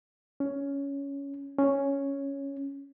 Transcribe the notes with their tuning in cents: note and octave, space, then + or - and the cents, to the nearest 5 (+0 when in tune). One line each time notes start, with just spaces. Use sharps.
C#4 +10
C#4 +0